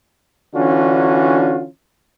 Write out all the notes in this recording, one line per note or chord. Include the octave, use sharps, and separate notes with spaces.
D3 E3 C#4 D4 F4 F#4